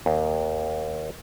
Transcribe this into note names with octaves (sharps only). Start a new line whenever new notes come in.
D#2